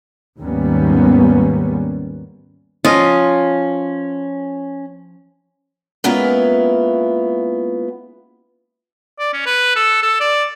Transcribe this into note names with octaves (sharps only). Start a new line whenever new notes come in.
D#2 G#2 G3 A#3 B3 C#4
F3 C#4 F4 D#5
G#3 A#3 B3 C#4 E4 F4
D5
C#4
B4
A4
A4
D5